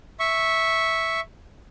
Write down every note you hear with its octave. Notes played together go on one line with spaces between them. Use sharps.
E5 C#6